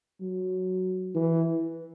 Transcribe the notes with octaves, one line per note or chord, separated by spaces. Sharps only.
F#3
E3